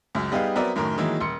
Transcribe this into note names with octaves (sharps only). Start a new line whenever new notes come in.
C#2 F#2
G3 B3 D#4 G4 G#4 F5
F#3 B3 C4 A#4 D5 E5
F#2 A2 D#3 A#4
D#3 E3 F#3 G#3 A#3 E4
D#1 C6 C#7